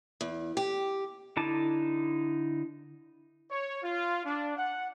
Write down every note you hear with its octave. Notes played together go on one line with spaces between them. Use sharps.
E2
G4
D3 D#4 E4 A5 D6
C#5
F4
D4
F#5